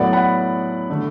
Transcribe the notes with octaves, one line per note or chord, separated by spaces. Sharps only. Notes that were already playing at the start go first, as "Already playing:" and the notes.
Already playing: A2 F#3 B3 D5 F#5
F#5 B5
D3 A3